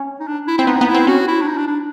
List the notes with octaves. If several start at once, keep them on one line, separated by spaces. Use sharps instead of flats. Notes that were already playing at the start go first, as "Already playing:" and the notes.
Already playing: C#4
D#4
D4
E4
C4 E4
B3 D#4
B3
E4
C4
C#4 F#4
E4
D4
D#4
D4
D4